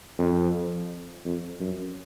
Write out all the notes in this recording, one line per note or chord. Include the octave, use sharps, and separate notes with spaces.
F2
F2
F#2